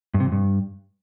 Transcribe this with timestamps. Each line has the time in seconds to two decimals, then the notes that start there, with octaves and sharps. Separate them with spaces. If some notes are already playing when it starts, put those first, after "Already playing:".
0.14 G2
0.20 C3
0.26 F2
0.32 G2